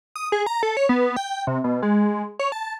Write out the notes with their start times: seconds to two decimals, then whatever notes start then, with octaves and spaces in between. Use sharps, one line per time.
0.16 D#6
0.32 G#4
0.46 A#5
0.63 A4
0.77 C#5
0.89 B3
1.16 G5
1.47 C3
1.64 B2
1.82 G#3
2.39 C#5
2.52 A5